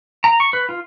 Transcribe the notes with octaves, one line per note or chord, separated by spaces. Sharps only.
A#5
C#6
B4
F4